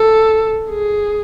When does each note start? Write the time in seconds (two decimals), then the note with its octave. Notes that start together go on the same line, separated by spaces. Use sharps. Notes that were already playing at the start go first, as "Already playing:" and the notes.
Already playing: A4
0.70 G#4